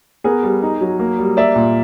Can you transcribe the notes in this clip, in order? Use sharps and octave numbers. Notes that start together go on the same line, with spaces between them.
B3 G#4 A#4
G3
D#4
F#3
A#3
G3
A#3 D5 E5
A#2